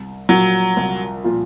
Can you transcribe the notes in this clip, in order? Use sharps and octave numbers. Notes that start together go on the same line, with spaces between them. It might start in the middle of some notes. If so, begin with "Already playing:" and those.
Already playing: C2
A#2 F3 F#3 A#3 F4
C2
A#2 F3 A#3 F4